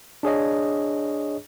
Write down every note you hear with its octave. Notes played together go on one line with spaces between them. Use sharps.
D4 G#4 C#5 D#5